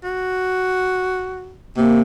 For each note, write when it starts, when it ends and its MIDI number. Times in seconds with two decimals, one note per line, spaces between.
0.04 1.55 66
1.77 2.01 48
1.77 2.01 58